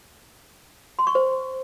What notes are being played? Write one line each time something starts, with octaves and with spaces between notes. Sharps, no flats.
C6
C#6
C5